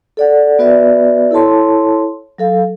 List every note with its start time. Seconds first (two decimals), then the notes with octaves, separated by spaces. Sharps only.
0.17 A4 D5 F#5
0.59 B3 F#4 B4 D5 E5
1.31 E4 A4 C#5 A5 C6
2.38 F#3 A4 F5